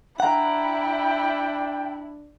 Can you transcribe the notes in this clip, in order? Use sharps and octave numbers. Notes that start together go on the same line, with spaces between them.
D4 E4 F#5 G5 A#5